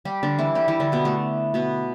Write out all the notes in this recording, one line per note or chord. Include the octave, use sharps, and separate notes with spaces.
G3 G4
D3 D4
E3 E4
G3 G4
E3 E4
D3 D4
B2 B3
A3
B2 B3